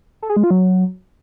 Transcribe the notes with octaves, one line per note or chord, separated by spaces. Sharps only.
A4
G#4
G#3
F4
F#3